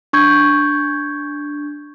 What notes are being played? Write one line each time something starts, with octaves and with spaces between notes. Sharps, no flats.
D4 C#6 G6 G#6